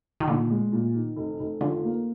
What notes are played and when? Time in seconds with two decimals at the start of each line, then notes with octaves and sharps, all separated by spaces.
0.20 D#3
0.28 A#2 D3
0.50 G#3
0.72 A#2
0.94 D#3
1.16 F1
1.40 F1
1.61 D3 F4
1.84 A#3